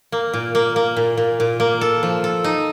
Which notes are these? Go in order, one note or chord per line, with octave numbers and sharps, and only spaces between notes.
A#3
A#2
A#3
A#3
A#2
A#2
A#2
A#3
A4
F3
A4
D#4